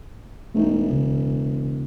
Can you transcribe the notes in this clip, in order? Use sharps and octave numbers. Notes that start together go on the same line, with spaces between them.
E1 A3 D#4
C#2 C#3